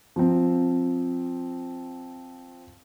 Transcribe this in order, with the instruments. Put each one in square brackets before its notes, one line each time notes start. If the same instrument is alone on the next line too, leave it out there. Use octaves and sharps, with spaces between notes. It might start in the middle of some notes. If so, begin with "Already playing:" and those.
[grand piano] F3 C4